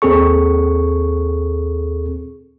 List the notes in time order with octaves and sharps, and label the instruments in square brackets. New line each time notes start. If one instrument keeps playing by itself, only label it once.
[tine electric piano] D#2 C4 G#4 A4 C#6